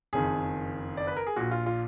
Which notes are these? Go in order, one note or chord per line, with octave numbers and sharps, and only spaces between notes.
F#1 F2 D#3 G#4
D5
B4
A#4
G#4
A#1 A#2 F#4
F4
F4